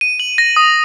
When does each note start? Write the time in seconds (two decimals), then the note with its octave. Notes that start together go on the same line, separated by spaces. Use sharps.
0.01 D#7
0.20 F#7
0.38 A#6
0.56 D#6